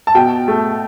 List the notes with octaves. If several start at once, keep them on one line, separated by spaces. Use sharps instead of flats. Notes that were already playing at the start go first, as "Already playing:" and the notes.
A5
B2 G5
A3